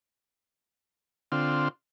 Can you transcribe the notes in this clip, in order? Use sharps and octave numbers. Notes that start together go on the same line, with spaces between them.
D3 C4 F4